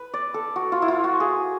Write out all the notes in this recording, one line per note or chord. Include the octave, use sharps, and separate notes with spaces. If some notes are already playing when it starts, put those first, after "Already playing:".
Already playing: B4
D5
A4
F#4
F4
E4
F4
F#4
G#4